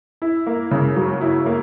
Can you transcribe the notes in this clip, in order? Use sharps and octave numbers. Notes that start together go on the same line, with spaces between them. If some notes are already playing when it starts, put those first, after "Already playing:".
E4
A#3
C#3
F#3
E4
A#3